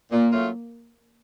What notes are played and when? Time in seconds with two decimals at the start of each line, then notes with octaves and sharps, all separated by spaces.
0.12 A#2 A#3
0.32 F#3 A3 C#4 F4